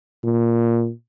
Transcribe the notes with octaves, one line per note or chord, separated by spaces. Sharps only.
A#2